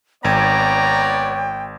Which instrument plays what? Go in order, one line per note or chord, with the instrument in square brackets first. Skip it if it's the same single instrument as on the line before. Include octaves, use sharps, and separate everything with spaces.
[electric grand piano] G#1 G#6 [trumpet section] B3 C#5 D5 [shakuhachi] G5 [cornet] A#5